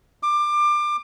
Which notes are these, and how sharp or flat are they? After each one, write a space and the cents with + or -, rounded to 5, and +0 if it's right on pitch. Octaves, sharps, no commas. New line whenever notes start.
D6 +25